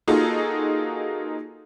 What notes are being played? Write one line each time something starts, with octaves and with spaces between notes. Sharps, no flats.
A#3 D#4 F4 F#4 G#4 A4